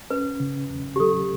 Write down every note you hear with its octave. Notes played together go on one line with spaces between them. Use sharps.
C#4 B4
C#3
E2
G4
F#3 A4